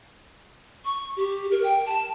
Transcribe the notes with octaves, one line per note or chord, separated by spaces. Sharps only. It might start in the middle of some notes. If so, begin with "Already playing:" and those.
C#6
G4
A#4
G5
A5